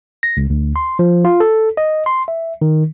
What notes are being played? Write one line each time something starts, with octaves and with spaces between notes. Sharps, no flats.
A#6
C#2
D2
C6
F3
F4
A4
D#5
C6
E5
D#3